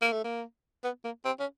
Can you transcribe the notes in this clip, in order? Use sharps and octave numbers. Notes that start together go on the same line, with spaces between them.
A#3
A3
A#3
B3
A#3
C4
C#4